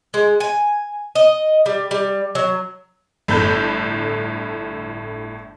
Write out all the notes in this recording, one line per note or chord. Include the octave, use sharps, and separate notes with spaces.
G#3
G#5
D#5
G3
G3
F#3
G1 A2 A4 B5 G6